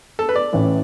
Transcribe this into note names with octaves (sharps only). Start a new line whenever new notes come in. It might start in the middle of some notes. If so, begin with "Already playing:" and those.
A4
B4
D5
A1 A2 E3 A3 E4